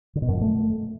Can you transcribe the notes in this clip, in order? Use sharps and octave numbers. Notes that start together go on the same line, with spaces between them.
D3
B2
F#2
F3
A3